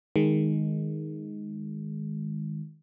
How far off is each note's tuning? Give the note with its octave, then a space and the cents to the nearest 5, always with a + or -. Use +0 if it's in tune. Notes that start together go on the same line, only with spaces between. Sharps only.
D#3 +0 G#3 +0